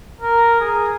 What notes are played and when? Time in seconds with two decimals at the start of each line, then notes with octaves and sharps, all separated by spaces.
0.20 A#4
0.60 G#4